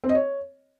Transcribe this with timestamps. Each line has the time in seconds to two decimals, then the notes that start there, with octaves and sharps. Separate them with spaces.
0.04 C4
0.09 D#5
0.15 C#5